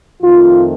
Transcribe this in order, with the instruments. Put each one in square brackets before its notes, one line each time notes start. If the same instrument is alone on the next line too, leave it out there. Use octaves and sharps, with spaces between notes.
[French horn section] F2 D#3 A3 C4 F4